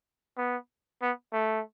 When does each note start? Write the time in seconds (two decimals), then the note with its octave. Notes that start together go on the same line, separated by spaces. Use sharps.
0.38 B3
1.02 B3
1.33 A3